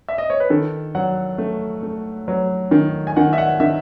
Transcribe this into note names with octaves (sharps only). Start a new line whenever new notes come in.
E5
D#5
C#5
B4
D#3 A4
F#3 F#5
A3
A3
F#3
D#3
G#5
D#3 F#5
E5
F#5
D#3 E5